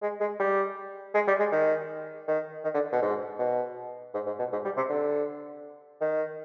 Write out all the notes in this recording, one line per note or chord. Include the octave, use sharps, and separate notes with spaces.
G#3
G#3
G3
G#3
G3
G#3
D#3
D#3
D#3
D3
B2
G#2
B2
G#2
G#2
B2
G#2
G3
C3
D3
D#3